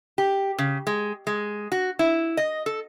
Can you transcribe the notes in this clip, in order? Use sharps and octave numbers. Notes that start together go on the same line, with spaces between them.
G4
C#3
G#3
G#3
F#4
E4
D#5
A4